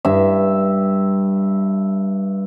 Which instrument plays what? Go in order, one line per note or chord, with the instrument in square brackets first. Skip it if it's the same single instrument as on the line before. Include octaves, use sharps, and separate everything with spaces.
[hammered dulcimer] G2 E5